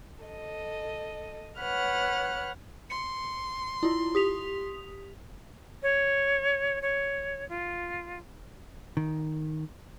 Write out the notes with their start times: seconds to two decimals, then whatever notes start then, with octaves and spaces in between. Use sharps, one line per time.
0.25 A4 D#5
1.60 B4 C#5 F#5 F6 F#6
2.90 C6 C#7
3.83 E4 F4
4.15 G4 D#6 B6 F7
5.82 C#5
6.82 C#5
7.48 F4
8.97 D#3